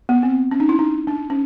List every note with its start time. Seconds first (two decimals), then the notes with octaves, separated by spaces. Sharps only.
0.09 B3
0.23 C4
0.51 C#4
0.60 D#4
0.69 E4
0.79 D#4
1.07 D4
1.30 C#4